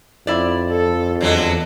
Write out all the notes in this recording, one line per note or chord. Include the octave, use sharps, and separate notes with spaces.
F2 E4 D5
A4
E2 D3 F#3 G#3